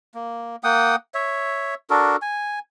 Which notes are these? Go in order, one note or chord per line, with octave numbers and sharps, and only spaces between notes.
A#3
A#3 F#5 G5 D#6
C#5 E5
D4 F#4 A4 A#4
G#5